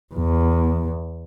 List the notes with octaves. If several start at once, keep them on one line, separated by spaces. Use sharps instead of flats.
E2